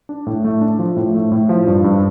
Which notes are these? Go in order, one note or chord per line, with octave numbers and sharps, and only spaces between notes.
D4
A2
A3
D4
F3
A2
A3
A2
F3
G2
G2